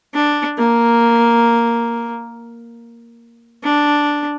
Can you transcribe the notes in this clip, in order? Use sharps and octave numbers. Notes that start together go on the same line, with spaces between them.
D4
A#3
D4